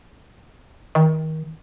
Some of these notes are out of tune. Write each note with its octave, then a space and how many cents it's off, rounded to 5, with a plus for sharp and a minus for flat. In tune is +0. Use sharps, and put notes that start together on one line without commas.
D#3 +25